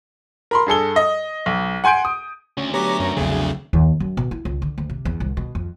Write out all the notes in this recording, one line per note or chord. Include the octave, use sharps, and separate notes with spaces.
A#4 B5 C6
G2 G#4 A4 G7
D#5
B1
F#5 G#5 C6 G6 D7
D#6
D2 C#4
F#3 B3 G4 C#5 A#5 D6
F#2
A#1 E2 C#3 F#3 A3 C4 G#4
D#2
F#2
B2
E4
C#2
D3
D2
C3
E2
C2
B2
F2